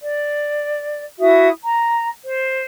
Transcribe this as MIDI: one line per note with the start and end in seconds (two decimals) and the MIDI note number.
0.01 1.05 74
1.19 1.48 64
1.19 1.48 66
1.19 1.48 76
1.19 1.48 87
1.62 2.06 82
2.25 2.66 72